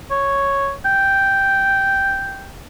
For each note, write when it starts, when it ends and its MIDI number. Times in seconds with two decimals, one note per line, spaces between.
0.11 0.72 73
0.86 2.53 79